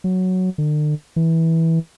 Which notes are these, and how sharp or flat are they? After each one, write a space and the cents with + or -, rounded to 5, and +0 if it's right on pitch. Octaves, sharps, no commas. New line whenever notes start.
F#3 +0
D3 +40
E3 -15